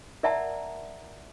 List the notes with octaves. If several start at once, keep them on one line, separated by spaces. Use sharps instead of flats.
A#4 D5 E5 F#5 A5 A#5